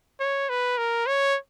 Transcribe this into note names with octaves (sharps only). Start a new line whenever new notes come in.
C#5
B4
A#4
C#5